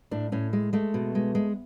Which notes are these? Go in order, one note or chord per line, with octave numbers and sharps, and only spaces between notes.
A2 D4
A2 C#4
G#3
G#3 A3
B2
G#3
G#3